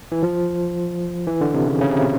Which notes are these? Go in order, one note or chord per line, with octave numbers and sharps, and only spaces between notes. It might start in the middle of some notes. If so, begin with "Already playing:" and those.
E3
F3
E3
D3
C3
C#3
C#3
C3
B2